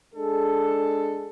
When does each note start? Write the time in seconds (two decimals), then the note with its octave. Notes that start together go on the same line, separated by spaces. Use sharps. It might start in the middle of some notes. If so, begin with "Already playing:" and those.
0.14 G#3 D4 G#4 A4